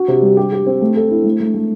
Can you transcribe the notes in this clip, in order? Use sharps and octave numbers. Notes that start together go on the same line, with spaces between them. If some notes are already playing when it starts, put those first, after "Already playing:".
Already playing: F#4
C3
G3
G4
G4
C4
A3
A4
E4
A3
A3
A3